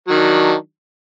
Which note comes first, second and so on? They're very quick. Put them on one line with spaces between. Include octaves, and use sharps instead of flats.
F#3 D#3 D4